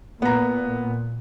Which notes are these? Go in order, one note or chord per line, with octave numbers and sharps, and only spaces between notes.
A#2 B3 A#5